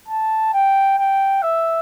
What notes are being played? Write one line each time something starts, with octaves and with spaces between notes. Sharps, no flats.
A5
G5
G5
E5